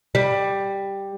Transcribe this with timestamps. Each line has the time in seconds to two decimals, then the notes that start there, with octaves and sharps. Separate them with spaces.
0.15 G3